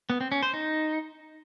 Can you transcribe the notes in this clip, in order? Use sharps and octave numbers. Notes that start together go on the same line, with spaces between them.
B3
C4
C#4
C5
D#4